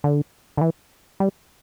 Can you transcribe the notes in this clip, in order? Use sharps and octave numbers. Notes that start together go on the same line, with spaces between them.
D3
D3
E3
G3